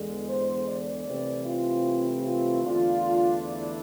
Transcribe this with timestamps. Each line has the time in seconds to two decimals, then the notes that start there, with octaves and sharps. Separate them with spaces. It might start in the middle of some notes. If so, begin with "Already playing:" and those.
Already playing: E2 D3 G#3
0.28 C5
0.67 D5
1.06 C2 C3 E3 A3 C4
1.45 F4
2.23 F4
2.63 E2 D3 A3 D4 F4
3.41 E4